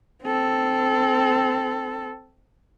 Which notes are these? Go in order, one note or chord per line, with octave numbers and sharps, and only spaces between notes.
C4 A4